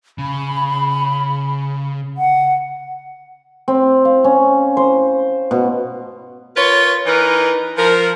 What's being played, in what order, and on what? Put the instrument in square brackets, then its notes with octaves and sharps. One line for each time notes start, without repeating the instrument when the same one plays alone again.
[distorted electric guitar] C#3 [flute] B5
[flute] F#5
[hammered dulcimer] C4
F5
C#4
C5
B2
[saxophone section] F4 A#4 B4 C#5
E3 D#4 A#4 B4
F3 A#4